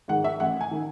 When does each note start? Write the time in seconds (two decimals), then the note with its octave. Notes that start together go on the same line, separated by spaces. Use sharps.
0.08 G#2 D#3 F#5
0.24 E5
0.40 A1 F#5
0.61 G#5
0.71 D#3